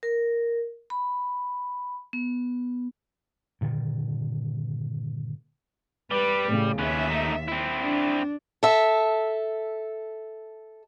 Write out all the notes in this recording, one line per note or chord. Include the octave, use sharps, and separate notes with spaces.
A#4
B5
B3
G2 A#2 D3 D#3
G3 B4
A2 C#3
D#2 C#4 B4 E5
A3 D#4
C4 E4
D4
A4 E5